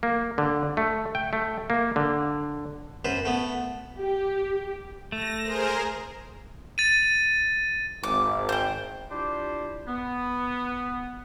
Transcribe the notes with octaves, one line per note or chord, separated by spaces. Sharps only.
A#3
D3
A3
G5
A3
A#3
D3
F#2 B4 C5
A3 B3
G4
A3 A#6
G#4 A#4 C5
A6 D#7
G#1 D6
C5 G5
D4 E4 F4 G4 C5 D5
B3